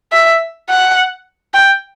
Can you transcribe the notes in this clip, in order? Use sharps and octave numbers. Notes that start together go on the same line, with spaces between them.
E5
F#5
G5